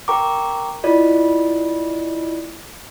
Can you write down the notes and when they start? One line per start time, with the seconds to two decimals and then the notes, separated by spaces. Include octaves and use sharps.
0.08 A#4 G5 A#5 C#6 D6
0.84 E4 F4 D5 D#5